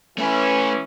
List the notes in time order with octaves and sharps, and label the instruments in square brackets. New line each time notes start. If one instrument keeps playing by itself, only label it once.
[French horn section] E3 C#4 [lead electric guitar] A3 B4